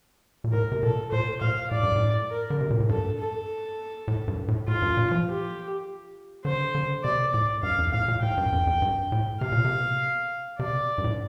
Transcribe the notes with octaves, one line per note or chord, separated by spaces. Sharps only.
A#2
A2 A#4
C3
A#2 A4
A#2 C5
A#2 F5
A2 D5
G2
A2
A#4
D3
C3
A#2
A2
G2 A4
A4
A2
G2
A2
A2 F4
G2
A#2
F3
G4
D3 C5
D3
C3 D5
A2 D5
G2 F5
F2
A2 F5
A#2
A2 G5
G2
F2
F2
G2
A2
C3 F5
A#2
C3
C3 D5
G2
A2